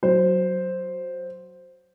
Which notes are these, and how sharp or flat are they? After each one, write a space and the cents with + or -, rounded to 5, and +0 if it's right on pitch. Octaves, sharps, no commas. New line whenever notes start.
F#3 +0 C5 +0